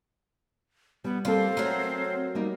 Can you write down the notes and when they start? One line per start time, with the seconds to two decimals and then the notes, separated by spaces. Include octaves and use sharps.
1.04 G3 B3
1.25 G3 A#3 C4 F4 A4
1.57 F#3 A3 A#4
2.35 G3 A#3 D#4